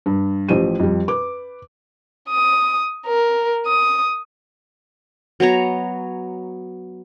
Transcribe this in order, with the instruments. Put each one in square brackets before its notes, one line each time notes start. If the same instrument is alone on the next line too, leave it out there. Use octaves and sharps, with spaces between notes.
[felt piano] G2
A1 F3 G4 C5 D#7
F2 G3
B4 D6
[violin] D#6
A#4
D#6
[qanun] F#3 B3 C#5 A#5